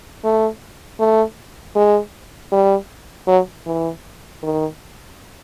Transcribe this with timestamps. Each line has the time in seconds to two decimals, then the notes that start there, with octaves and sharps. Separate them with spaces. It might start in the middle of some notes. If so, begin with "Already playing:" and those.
0.24 A3
1.00 A3
1.76 G#3
2.52 G3
3.28 F#3
3.66 E3
4.43 D#3